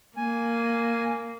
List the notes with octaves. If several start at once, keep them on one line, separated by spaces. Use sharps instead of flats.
A#3 G#5